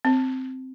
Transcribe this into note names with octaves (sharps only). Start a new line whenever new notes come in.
C4